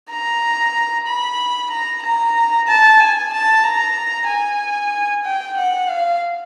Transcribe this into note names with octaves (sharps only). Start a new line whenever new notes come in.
A#5
B5
A#5
A#5
A5
G#5
A5
A#5
G#5
G5
F#5
F5